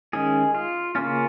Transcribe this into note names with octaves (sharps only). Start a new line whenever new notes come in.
D#3 G#3 C#4 G#4
F4
C#3 A#3 C#4 F4